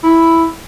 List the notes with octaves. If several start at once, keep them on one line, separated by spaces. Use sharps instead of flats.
E4